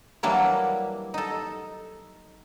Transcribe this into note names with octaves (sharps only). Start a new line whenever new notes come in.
E3 F#3 G3 A#3 D4 E4
D#4 A4